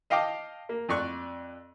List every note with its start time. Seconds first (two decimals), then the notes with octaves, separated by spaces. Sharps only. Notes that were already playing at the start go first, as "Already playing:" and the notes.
0.10 D#5 F5 G5 A5 D6
0.69 A#3
0.89 F2 D5 C#6 F#6